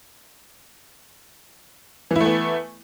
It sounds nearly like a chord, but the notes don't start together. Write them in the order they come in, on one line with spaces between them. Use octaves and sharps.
E3 E4 A3 B3